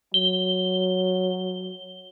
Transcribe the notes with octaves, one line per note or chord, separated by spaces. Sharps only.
F#3 G7